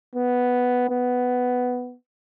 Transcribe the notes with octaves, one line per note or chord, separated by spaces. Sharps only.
B3
B3